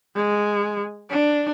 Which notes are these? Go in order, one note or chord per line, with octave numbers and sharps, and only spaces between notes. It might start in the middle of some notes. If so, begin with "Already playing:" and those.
G#3
D4